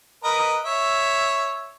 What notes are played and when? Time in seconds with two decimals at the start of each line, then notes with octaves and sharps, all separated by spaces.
0.24 A#4 B4 D#5
0.65 C#5 E5